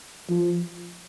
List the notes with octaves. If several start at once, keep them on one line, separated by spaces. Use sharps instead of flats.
F3